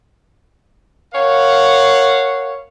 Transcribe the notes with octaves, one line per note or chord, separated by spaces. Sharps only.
A#4 C#5 F5 F#5